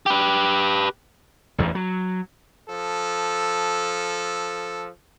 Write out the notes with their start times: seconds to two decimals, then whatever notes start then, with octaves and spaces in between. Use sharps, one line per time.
0.06 G4 B4
1.58 A1 E2 G2
1.75 F#3
2.69 F3 A4